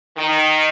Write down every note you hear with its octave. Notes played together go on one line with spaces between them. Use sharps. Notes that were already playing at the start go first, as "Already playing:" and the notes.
D#3